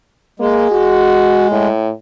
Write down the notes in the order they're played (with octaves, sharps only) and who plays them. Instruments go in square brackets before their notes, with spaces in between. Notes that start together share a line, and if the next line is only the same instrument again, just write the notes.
[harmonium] G#3 [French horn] A#3
[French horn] F#4
A2